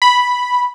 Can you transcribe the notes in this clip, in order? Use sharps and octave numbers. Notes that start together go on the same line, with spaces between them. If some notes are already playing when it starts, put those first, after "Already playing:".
B5